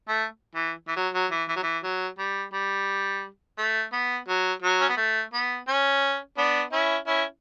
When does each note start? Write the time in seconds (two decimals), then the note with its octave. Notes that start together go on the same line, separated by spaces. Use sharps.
0.08 A3
0.55 E3
0.88 E3
0.96 F#3
1.14 F#3
1.31 E3
1.49 E3
1.56 F#3
1.63 E3
1.83 F#3
2.19 G3
2.53 G3
3.58 A3
3.93 B3
4.28 F#3
4.62 F#3
4.81 C#4
4.90 B3
4.97 A3
5.33 B3
5.68 C#4
6.38 B3 D4
6.73 C#4 E4
7.07 C#4 E4